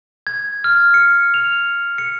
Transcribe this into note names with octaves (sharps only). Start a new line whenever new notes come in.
G#6
F6
C#7
F7
C#7